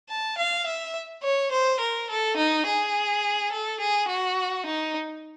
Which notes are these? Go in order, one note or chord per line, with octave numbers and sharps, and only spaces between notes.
A5
F5
E5
C#5
C5
A#4
A4
D#4
G#4
A4
G#4
F#4
D#4